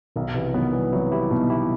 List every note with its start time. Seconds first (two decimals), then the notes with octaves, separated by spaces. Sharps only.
0.16 B1 B2 D#3
0.34 C3 E3
0.54 D#3 F#3 B3
0.73 E3 G3
0.92 F#3 C4 E4
1.12 E4 G4
1.30 B2 D#4 F#4
1.49 E4 G4